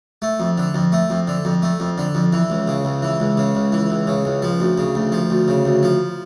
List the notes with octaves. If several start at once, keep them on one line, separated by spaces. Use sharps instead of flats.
A3
F2
D3
F2
A3
F2
D3
F2
A3
F2
D3
F2
E3
C#2
C#3
C#2
E3
C#2
C#3
C#2
E3
C#2
C#3
C#2
F3
D2
C#3
D2
F3
D2
C#3
D2
F3